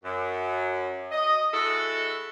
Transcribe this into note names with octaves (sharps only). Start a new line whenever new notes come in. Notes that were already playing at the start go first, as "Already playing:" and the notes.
F#2
D#5
G#3 E4 F#4 A4